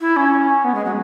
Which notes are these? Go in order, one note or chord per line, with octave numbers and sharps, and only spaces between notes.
E4
C#4
B3
G#3
F#3